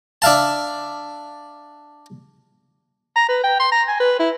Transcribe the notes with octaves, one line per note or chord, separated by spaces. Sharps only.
D4 E5 F5 A5
A#5
B4
G5
C6
A#5
G#5
B4
E4